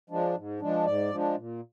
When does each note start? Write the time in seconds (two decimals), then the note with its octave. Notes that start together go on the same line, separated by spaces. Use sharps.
0.10 F3 G#3 D4
0.35 G#2
0.60 F3 G#3 D4
0.85 G#2 D5
1.10 F3 G#3 D4
1.36 A#2